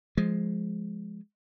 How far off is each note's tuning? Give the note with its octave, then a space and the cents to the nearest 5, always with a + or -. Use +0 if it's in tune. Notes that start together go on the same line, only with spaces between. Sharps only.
F3 +0 G#3 +5